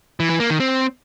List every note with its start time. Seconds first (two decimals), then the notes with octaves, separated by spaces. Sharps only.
0.20 E3
0.30 E3
0.40 A#3
0.50 D#3
0.60 C4